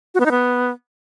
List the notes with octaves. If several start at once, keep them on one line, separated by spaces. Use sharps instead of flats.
F#4
B3
D#4
B3